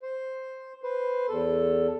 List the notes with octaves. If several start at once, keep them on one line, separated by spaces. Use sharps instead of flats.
C5
B4 C5
E2 A4